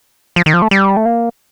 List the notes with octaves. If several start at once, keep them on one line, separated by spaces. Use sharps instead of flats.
F3
D#3
F3
A3
G3
A3
A#3